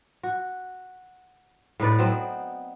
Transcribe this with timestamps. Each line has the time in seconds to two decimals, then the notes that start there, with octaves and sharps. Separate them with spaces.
0.23 F#4
1.80 A2 D#4 B4 D5
1.99 F#3 B3 C4